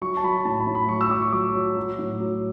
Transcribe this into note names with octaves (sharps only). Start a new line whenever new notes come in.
F#3 C#6
A5
F#3 B5
A2 A5
B5
A2
B5
F#3 C#6
E6
F#3 D6
C#6
F#3 D6
F#3
F#3
A2
F#3